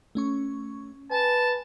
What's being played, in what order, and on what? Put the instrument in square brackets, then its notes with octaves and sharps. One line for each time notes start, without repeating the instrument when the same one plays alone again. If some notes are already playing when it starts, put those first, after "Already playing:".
[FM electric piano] A3 C#4 C#6
[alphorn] B4 [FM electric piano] G#5 [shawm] A5